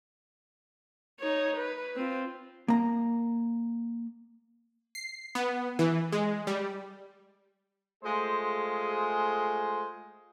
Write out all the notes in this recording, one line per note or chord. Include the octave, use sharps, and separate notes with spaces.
D#4 C#5
B4
C4 F4
A#3 A#5
C7
B3
E3
G#3
G3
G#3 A3 F4 G#4 C5